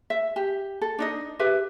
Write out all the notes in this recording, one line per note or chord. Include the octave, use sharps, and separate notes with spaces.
E5
G4
A4
D4 D#4 D#5
G4 B4 E5